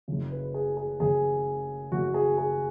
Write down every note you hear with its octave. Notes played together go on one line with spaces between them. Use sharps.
F#1 F#2 C#3
B4
G#4
G#4
F#1 F#2 C#3 G#4
F#1 F#2 C#3 F#4
G#4
G#4